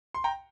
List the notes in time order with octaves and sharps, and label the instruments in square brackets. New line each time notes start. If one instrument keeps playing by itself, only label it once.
[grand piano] C6
G5 A#5